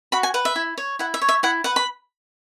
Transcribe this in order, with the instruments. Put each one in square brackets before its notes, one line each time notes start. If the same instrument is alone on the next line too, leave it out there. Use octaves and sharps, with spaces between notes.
[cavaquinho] F#4 B5
G#5
B4 F#5
E5
E4
C#5
E4 F#5
E5
C#5
E5
E4 F#5
B4 F#5
B5